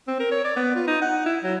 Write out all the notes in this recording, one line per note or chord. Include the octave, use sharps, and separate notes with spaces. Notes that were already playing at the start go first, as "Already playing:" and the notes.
C4
A#4
C#5
D5
B3
F4
D#4
F#5
E4
F#3